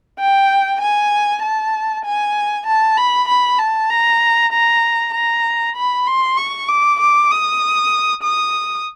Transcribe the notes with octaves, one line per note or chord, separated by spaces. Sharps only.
G5
G#5
A5
G#5
A5
B5
B5
A5
A#5
A#5
A#5
B5
C6
C#6
D6
D6
D#6
D#6